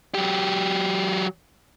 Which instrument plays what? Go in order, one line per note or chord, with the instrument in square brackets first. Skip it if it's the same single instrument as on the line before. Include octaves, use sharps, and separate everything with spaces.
[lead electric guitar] F#3 G4